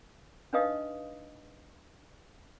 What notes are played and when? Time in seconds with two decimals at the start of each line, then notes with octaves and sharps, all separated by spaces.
0.53 D4 D#4 B4 D#5 F5 D#6